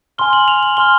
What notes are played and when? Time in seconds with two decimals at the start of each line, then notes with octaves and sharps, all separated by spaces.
0.18 G#5 C6 F6 G7
0.33 F#7
0.48 F7
0.63 F#7
0.77 G#5 C6 F6 G7